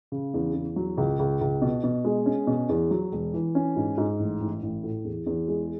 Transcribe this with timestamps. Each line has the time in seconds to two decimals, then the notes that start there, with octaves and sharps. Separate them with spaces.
0.12 C#3
0.34 E2
0.55 E2
0.76 F#3
0.98 C#2
1.19 C#2
1.41 C#2
1.62 B2
1.84 B2
2.05 G#3
2.26 C#4
2.47 B2
2.69 E2
2.91 F#3
3.12 E1
3.34 E3
3.55 C#4
3.76 G#2
3.98 G#2
4.19 A1
4.40 A1
4.62 A1
4.84 A2
5.05 E2
5.26 E2
5.48 G#3